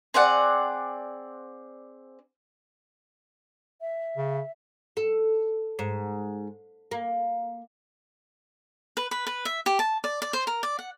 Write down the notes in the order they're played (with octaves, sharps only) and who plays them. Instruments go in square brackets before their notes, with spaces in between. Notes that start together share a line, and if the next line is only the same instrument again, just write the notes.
[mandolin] C4 G#4 D5 F#5
[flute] E5
[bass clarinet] C#3
[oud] A4
G#2
A#3
[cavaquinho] B4
B4
B4
E5
G4
A5
D5
D5
C5
A#4
D5
F#5